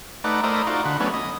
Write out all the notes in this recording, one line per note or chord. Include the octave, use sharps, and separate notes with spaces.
A3 D#4 B4 D5 F#5
A3 E4 A#4 C5 D5 D#5
D#4 F4 F#4 D5
D3 F#5 B5
F#3 A3 B3 C#4 D4
D#5